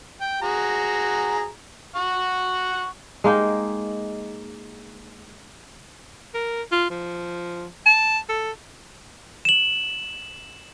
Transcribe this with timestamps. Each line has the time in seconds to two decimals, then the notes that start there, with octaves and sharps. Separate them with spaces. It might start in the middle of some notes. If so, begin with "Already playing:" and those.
0.21 G5
0.42 F#4 G#4 A#5
1.96 F#5 C#6
3.24 G#3 A#3 D#4 G5
6.34 A#4
6.72 F4
6.90 F3
7.86 A5
8.29 A4
9.45 E7 F#7